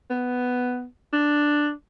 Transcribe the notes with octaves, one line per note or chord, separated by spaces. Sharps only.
B3
D4